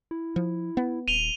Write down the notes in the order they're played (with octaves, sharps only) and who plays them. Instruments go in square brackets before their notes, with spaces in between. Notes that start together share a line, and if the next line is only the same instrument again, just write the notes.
[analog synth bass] E4
[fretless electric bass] F3
B3
[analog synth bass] D#1 [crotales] D#7 F7 G7